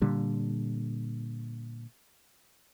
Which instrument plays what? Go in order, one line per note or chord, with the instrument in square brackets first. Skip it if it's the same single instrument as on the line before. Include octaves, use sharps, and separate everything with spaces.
[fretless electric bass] A#2 D3 G3